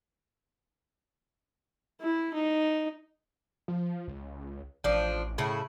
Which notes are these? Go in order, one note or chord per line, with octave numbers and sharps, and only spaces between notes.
E4
D#4
F3
C#2
A1 F3 D4
A2 C#3 E4